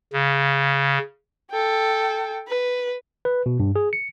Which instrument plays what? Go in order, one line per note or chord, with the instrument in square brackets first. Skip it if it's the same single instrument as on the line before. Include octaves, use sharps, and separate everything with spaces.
[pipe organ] C#3
[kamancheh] A4 G5
B4
[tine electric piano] B4
B2
G2
G#4
C#7